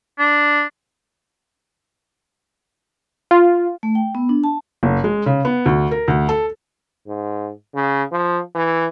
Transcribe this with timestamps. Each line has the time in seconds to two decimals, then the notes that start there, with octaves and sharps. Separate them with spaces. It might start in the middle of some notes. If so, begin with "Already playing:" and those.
0.19 D4
3.31 F4
3.83 A3
3.95 G5
4.15 B3
4.29 D4
4.44 A5
4.83 F#1
5.04 G#3
5.26 C#3
5.45 B3
5.66 D2
5.91 A#4
6.08 D2
6.29 A4
7.07 G#2
7.75 C#3
8.12 F3
8.55 E3